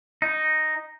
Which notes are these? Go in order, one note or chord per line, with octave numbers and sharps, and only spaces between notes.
D#4